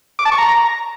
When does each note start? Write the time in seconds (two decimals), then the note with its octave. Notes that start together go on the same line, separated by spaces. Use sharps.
0.19 D6
0.25 A5
0.32 C#6
0.38 A#5